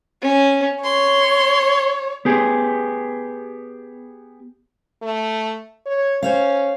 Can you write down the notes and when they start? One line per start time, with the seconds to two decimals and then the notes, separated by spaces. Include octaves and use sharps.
0.22 C#4
0.84 C#5 C6
2.25 B3 G4 G#4
5.02 A3
5.86 C#5
6.23 C#4 C5 C#5 F5